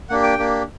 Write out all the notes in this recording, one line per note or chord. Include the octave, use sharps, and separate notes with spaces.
A#3 D4 G4 F#5
G5
A#3 D4 G4